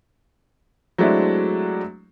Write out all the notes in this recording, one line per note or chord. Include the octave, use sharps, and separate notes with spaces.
F#3 G#3 A3 C4 D4 E4